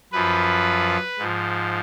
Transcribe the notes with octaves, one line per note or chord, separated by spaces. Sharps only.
F#2 F3 B4
G#2 F3